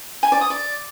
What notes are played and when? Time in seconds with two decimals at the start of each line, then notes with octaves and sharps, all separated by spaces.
0.23 G#5
0.32 D5
0.41 D#6
0.50 D5